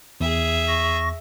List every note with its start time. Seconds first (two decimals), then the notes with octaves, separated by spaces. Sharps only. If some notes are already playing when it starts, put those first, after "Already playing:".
0.20 E2 G#4 E5
0.67 C#6 A#6